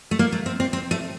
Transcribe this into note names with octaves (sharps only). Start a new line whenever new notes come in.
A3
A#3
A3
C4
C4
C4
A3